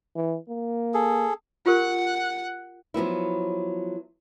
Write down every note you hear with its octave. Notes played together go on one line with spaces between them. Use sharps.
E3
A#3
G#4 A4
F4 G4 A#4 F#5 F#6
F3 F#3 B3 E4